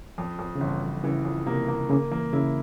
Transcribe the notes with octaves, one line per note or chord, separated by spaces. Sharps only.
F2 F3
F2
C#3
G1 E3
G1
C#3 E3
F2
C3 A#3
A#3
C#3 A#3
E3 A#3
C#3 E4